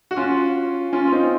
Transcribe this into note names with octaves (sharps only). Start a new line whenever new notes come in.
F#4
C#4 F4
C#4 F4
F4
C4 D#4